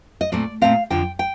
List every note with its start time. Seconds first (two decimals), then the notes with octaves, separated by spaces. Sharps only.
0.21 D#5
0.32 A#2 A3 C4 D5
0.62 A#2 A3 C4 F5
0.90 F2 D3 F3 G5
1.19 G5